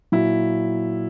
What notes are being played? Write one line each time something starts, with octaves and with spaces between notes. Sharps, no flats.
A#2 F#3 E4